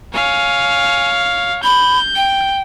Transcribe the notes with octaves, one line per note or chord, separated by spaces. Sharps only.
C#5 F5 G#5
B5 G6
G5